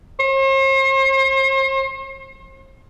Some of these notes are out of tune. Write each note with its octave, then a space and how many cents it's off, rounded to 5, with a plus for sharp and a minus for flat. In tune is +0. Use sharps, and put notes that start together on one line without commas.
C5 +45